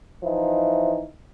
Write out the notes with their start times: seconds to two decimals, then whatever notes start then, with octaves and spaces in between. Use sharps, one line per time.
0.23 E3 F3 D#4 E4